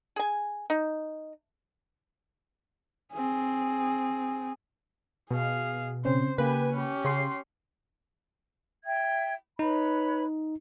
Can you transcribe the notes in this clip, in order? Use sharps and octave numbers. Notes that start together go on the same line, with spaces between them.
G#4 G#5
D#4
C4 G#4
B2 G#4 F5
C#3 C4 C#4 C5
C#3 A#3 G4 B4 G#5
C#4 G4
C#3 C#5 C6 C7
E5 G5 G#6
D#4 B4 C#5 B5